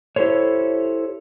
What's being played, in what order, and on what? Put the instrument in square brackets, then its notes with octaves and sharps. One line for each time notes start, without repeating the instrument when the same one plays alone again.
[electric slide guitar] E4 G4 A4 C5 C#5